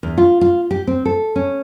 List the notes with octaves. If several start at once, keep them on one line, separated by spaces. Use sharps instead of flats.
E2
F4
F4
G4
C4
A4
C#4